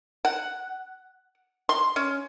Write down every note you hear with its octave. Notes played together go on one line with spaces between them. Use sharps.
F#5
C6
C#4